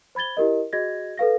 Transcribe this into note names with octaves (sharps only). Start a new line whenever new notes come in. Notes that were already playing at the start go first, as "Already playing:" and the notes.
C5 B5 G#6 A6 G7
E4 G4 A#4 D#5
F#4 G#4 D#5 G#6 A#6
A4 B4 F5 A#6